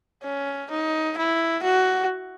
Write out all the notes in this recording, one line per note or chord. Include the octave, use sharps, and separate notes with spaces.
C#4
D#4
E4
F#4